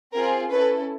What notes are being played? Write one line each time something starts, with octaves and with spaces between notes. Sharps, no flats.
C4 F4 G#4 A#4
C#4 E4 A4 B4